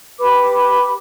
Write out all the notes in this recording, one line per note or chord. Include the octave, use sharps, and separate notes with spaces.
G4 B4 B5 D6